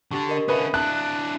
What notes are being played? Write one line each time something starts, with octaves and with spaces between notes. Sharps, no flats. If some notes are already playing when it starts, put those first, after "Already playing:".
D3 D4 G4 C#6
A#4 D#5
D3 C#4 B4 E5 D#6
D4 E4 F#6